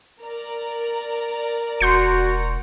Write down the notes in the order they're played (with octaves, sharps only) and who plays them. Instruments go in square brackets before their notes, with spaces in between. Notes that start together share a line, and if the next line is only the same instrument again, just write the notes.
[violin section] A#4 D5 A#5
[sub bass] E1 [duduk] F#4 [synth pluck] C6 G6 C#7